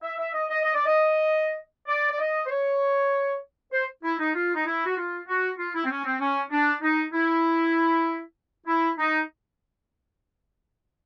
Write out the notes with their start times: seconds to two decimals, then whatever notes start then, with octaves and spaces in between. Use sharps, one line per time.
0.02 E5
0.17 E5
0.33 D#5
0.49 D#5
0.64 D#5
0.74 D5
0.85 D#5
1.87 D5
2.10 D5
2.19 D#5
2.45 C5
2.49 C#5
3.72 C5
4.03 E4
4.19 D#4
4.35 F4
4.54 D#4
4.66 E4
4.85 F#4
4.97 F4
5.27 F#4
5.58 F4
5.74 E4
5.85 C4
5.90 C#4
6.04 C4
6.19 C#4
6.51 D4
6.81 D#4
7.13 E4
8.67 E4
8.98 D#4